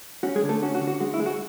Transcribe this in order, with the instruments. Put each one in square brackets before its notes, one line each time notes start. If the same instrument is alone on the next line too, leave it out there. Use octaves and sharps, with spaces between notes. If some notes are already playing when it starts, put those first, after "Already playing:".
[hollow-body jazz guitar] C#4 F#4
G#3 G#4
D3
A3 A4
C#4 F#4
F#4
D3
F#4
G#3 F#4
E4
G#3
F#4